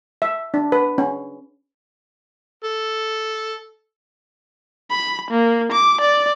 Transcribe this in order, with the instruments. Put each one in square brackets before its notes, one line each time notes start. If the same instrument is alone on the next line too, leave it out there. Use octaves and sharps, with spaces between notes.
[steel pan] E5
D4
B4
C#4
[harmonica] A4
[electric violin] B5
A#3
D6
D5